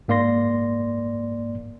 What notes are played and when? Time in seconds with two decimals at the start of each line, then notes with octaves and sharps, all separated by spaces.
0.08 G#2 A#3 D5 C6 A#6